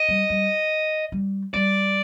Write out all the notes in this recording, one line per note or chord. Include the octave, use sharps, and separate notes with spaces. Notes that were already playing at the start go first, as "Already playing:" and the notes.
Already playing: D#5
G3
G3
G3
G3 D5